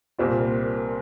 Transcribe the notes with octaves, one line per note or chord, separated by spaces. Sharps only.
C2 A#2 G3 C4 F4